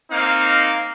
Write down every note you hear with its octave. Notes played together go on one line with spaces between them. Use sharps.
A#3 C4 D#4 F5